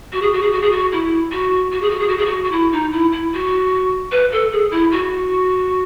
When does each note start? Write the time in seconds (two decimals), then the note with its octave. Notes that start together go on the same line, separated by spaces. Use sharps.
0.12 F#4
0.22 G#4
0.32 F#4
0.42 G#4
0.52 F#4
0.62 G#4
0.72 F#4
0.92 E4
1.32 F#4
1.72 F#4
1.82 G#4
1.90 F#4
1.99 G#4
2.08 F#4
2.18 G#4
2.26 F#4
2.44 F#4
2.51 E4
2.72 D#4
2.92 E4
3.12 E4
3.32 F#4
4.12 B4
4.32 A4
4.52 G#4
4.71 E4
4.92 F#4